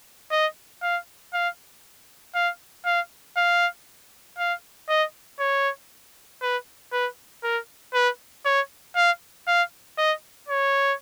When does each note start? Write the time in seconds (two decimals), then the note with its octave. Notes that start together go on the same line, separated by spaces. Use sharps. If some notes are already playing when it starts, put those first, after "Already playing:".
0.31 D#5
0.83 F5
1.33 F5
2.35 F5
2.85 F5
3.36 F5
4.38 F5
4.89 D#5
5.40 C#5
6.42 B4
6.92 B4
7.43 A#4
7.94 B4
8.45 C#5
8.96 F5
9.47 F5
9.98 D#5
10.49 C#5